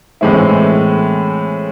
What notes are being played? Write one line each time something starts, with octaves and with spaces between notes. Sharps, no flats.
A2 E3 G#3 C4 E4